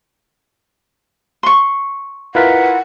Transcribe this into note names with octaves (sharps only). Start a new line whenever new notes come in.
C6 C#6
E4 F4 A#4 B4 F#5 F#6 B6